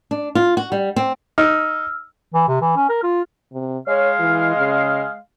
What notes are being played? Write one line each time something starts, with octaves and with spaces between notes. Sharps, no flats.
D4
F4
F#4
G3
C4
D#4 E6 F6
E3
C3
E3
C#4
A#4
F4
C3
G#3 C#5 F5
E3
C#3